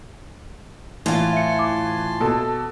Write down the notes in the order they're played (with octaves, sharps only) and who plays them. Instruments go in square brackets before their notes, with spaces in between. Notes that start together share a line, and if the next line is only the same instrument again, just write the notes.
[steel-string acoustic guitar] A2 F4 [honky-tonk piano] E3 [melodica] G#5 A5 C6
[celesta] E5 C#7
D6
[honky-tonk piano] B2 A4